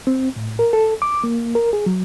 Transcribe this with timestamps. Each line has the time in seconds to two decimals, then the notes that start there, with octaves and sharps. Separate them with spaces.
0.07 C4
0.36 A2
0.59 A#4
0.73 A4
1.02 D6
1.24 A#3
1.55 A#4
1.73 G#4
1.86 F#3